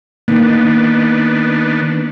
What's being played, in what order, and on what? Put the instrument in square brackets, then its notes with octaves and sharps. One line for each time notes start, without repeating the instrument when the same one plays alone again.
[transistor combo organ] D#3 B3 D4 [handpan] A#3 D#4